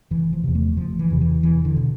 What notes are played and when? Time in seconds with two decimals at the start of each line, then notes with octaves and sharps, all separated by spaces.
0.11 F1 E3
0.33 F3
0.44 E2 C3
0.55 A3
0.77 F1 F3
0.99 E3
1.10 E2 C3
1.21 E3
1.43 E1 E3
1.65 D3
1.77 B2